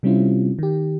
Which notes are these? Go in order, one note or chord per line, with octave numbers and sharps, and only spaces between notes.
C3 G3 C4 C#4 E4 F4
D#3 G4